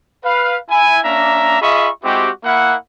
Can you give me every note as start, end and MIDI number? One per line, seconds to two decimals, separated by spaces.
0.24 0.56 71
0.24 0.56 77
0.69 1.00 64
0.69 1.00 80
1.04 1.59 58
1.04 1.59 61
1.04 1.59 62
1.04 1.59 76
1.04 1.59 82
1.61 1.89 65
1.61 1.89 68
1.61 1.89 75
1.61 1.89 76
1.61 1.89 83
1.61 1.89 85
2.04 2.30 56
2.04 2.30 60
2.04 2.30 64
2.04 2.30 66
2.04 2.30 67
2.44 2.73 58
2.44 2.73 64
2.44 2.73 78